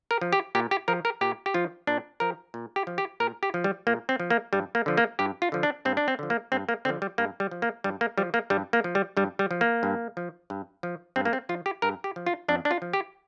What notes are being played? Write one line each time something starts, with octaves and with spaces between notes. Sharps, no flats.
A#4
F3
G4
A#2 G4
G4
F3 A#4
A#4
A#2 G4
G4
F3 F4
A#2 D4
F3 A#4
A#2
G4
F3
G4
A#2 A#4
G4
F3
G3
A#2 A#3
C4
F3
A#3
G2 G3
A#3
D3 F3
A#3
G2 G4
F4
D3 F3
D4
G2 C4
D4
C4
D3 F3
A#3
G2 C4
A#3
D3 F3 C4
G3
G2 A#3
G3
F3
A#3
G2 G3
A#3
F3 G3
A#3
G2 G3
A#3
F3
G3
G2 G3
G3
F3
A#3
G2
F3
G2
F3
G2 C4
A#3
C4
F3 F4
G4
G2 A#4
G4
F3
F4
F2 D4
D4
F4
F3
G4